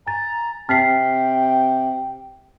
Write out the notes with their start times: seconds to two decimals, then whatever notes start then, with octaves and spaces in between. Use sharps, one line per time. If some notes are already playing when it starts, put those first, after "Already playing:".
0.07 G#5 A#5 A6
0.69 C3 C4 G5 F6 B6 C7